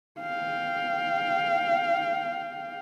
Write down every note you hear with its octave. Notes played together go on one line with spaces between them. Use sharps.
F5 G5